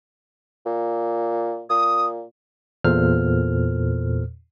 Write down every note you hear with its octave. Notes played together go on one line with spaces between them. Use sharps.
A#2
A#2 D#6
E2 A#2 A4 C5 F6